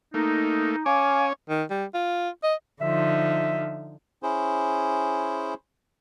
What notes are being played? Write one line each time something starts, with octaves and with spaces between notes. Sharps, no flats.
A3 A#3 D#4
C#4 C#5 F5 G#5 D6
D#3
G3
F4
D#5
D3 F3 D#4 E5
C#4 E4 G#4 C5